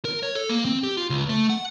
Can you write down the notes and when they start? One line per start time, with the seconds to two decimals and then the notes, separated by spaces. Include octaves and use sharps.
0.05 A#4
0.23 C#5
0.35 A4
0.49 A#3
0.65 C4
0.83 G4
0.97 F4
1.10 C#2
1.29 A3
1.50 F#5